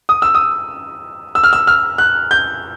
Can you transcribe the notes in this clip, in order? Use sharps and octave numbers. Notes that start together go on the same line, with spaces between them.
D#6
E6
D#6
E6
F6
E6
F6
F#6
G6